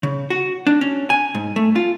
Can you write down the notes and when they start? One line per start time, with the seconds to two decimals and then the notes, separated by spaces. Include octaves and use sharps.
0.03 C#3
0.30 F#4
0.67 D4
0.81 C#4
1.10 G#5
1.35 G#2
1.56 A3
1.76 F4